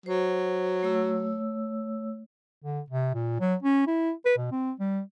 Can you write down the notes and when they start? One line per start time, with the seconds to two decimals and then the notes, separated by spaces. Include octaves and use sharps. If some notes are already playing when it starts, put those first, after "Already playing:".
0.06 F#3 C5
0.83 A3 C#5 E6
2.63 D3
2.90 C3
3.14 A#2
3.40 F#3
3.63 C#4
3.87 E4
4.25 B4
4.37 B2
4.51 C4
4.80 G3